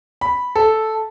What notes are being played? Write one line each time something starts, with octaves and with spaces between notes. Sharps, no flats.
B5
A4